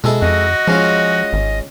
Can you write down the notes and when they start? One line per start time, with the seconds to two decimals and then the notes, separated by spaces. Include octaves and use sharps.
0.04 B2 G#3 E4 A4
0.22 F2 F#4 D#5
0.68 F3 G#3 C#4 F4
1.33 G#1